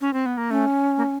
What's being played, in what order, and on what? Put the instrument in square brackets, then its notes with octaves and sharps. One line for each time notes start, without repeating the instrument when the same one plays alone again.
[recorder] C#4
C4
B3
A#3
[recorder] A3 [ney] C#4
[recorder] A#3